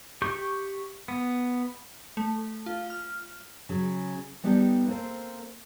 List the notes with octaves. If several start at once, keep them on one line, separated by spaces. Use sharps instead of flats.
G4 C#6 G6
B3
A3
F4
F6
C#3 F#3 C#4
G3 B3 D#4 G4 A4
A#3 C4 A4 C5